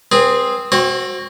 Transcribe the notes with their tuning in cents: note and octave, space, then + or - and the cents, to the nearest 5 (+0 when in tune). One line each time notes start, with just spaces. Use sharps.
C4 +0 G#4 +0 B4 -35
C4 +15 F#4 +0 C#5 -45